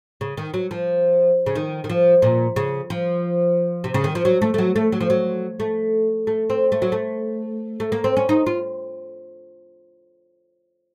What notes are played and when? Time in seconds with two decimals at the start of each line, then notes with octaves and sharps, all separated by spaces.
0.21 C#3
0.37 D#3
0.54 F#3
0.71 F3
1.46 C#3
1.56 D#3
1.84 D#3
1.89 F3
2.22 A#2
2.56 C#3
2.90 F3
3.84 C3
3.94 C#3
4.04 D#3
4.15 F3
4.25 F#3
4.42 A3
4.54 A3
4.58 F#3
4.76 A3
4.92 F#3
5.00 F3
5.10 F#3
5.60 A3
6.27 A3
6.50 C4
6.72 A3
6.82 F#3
6.92 A3
7.80 A3
7.92 A#3
8.04 C4
8.17 C#4
8.29 D#4
8.47 F4